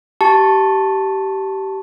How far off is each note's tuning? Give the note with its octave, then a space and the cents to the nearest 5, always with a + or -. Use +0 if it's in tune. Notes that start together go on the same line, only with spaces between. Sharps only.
G4 -20 A5 +0 C#6 +0